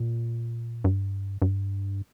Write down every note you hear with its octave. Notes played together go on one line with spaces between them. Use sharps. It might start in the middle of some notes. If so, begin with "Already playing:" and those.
Already playing: A#2
G2
G2